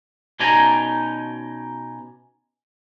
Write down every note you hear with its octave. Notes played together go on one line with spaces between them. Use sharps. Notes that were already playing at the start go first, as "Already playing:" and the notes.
B2 C#4 D#4 D5 G#5 A#5